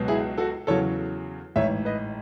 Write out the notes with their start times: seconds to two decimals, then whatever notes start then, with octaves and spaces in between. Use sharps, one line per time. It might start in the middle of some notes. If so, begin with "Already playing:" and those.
Already playing: C#2 B2 F#3
0.08 E4 G#4
0.38 F#4 A4
0.67 E2 C#3 F#3 A4 C#5
1.56 A1 G#2 E3 C#5 E5
1.85 B4 D#5